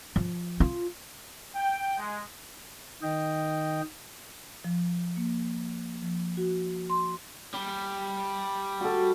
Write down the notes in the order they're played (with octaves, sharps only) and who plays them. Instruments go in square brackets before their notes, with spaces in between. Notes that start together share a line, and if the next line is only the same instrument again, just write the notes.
[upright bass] F3
F4
[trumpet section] G5
G#3
[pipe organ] D#3 D#5 G5
[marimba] F3
A#3
F3
F#4
C6
[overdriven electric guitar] G3
[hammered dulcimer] F#4 A4